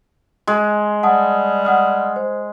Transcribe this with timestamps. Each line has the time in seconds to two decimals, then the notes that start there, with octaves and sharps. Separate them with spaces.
0.47 G#3
1.03 G3 F#5 A5 D#6
1.65 F#5 D#6 F6
2.16 C5